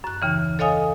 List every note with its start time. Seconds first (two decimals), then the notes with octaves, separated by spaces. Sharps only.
0.04 F#2 F#6
0.22 D#2 C#3 E3
0.59 A4 C#5 D#5 F5 G#5 D#6